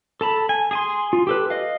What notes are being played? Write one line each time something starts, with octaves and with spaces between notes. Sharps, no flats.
A4 A5 B5
G#5
G#4 G#5 C6
F4
G4 A4 B4
D#5 F5